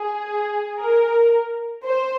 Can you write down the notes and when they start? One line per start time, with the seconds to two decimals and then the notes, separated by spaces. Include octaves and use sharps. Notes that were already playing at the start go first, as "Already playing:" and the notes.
Already playing: G#4
0.79 A#4
1.84 C5